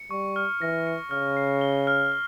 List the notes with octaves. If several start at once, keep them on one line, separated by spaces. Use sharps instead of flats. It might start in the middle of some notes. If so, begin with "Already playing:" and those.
Already playing: C#7
G3 C#6
F6
E3 A#6
C#7
C#3 F6
C7
G7
F6
F6